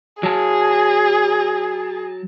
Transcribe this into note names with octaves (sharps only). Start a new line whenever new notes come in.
F#3 G#4 A5